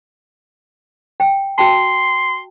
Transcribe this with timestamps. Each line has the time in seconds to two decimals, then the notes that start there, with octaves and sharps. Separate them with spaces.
1.20 G5
1.58 F#4 G5 A5 C6